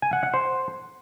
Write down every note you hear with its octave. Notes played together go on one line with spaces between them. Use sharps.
G#5
F#5
F#5
C5